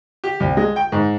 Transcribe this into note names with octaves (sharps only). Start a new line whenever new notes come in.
G4
C2
G#3
G5
G#2